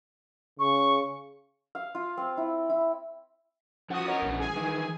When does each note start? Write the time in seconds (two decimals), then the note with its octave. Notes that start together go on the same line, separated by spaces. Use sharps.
0.59 C#3 C#6
1.75 F5
1.95 F4
2.17 C4
2.37 E4
2.70 E4
3.90 E2 F3 C#4 F#4 F#5 D#6
4.07 A#4 C#5 D#5
4.22 A#1
4.39 G#4 G#5
4.56 D#3 E3